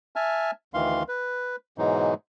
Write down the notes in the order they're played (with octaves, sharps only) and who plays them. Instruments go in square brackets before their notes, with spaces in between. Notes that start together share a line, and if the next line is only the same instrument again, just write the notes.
[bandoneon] E5 G#5 A5 F6
D2 D#3 E3 F5 C6
B4
G#2 B2 E3 F#3 G#3 D#4